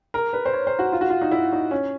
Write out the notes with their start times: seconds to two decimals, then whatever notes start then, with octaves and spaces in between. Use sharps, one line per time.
0.14 A#4
0.33 B4
0.46 C5
0.53 C#5
0.67 C5
0.79 F#4
0.92 F4
1.01 F#4
1.10 F4
1.22 D#4
1.31 E4
1.52 D#4
1.71 C#4